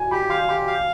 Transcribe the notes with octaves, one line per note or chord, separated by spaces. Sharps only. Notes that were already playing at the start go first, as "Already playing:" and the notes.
Already playing: G#5
G4 B5
F5 C6
G4 C6
F5